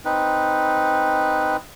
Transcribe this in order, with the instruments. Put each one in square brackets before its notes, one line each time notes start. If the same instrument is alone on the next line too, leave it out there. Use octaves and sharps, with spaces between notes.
[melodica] C4 D#4 B4